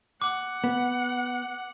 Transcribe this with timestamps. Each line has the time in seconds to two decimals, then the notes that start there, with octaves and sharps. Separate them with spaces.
0.22 F#5 D6
0.64 B3